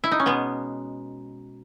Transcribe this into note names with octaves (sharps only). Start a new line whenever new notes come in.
E4
D#4
C#4
B2 G#3 B3